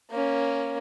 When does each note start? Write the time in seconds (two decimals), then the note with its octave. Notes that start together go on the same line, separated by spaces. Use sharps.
0.10 A#3 C#4